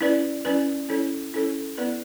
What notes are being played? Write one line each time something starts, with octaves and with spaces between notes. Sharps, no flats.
C#4 E4 B4 D5
C#4 E4 B4 D5
C#4 E4 A4 C#5
C#4 E4 A4 C#5
B3 E4 B4 D5